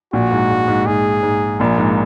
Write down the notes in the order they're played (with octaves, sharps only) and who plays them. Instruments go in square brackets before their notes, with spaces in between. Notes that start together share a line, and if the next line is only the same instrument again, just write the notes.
[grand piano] A#1 A#2 [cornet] F#4
[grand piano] G#2
G#2
G#2
[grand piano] G#2 [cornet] G#4
[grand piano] G#2
[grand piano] A#1 A#2 [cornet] A#4
[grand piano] G#2